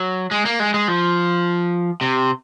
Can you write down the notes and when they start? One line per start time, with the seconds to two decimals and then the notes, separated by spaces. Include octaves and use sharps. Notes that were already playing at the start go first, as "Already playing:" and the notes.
Already playing: F#3
0.31 G#3
0.45 A#3
0.60 G#3
0.74 G#3
0.88 F3
2.01 C3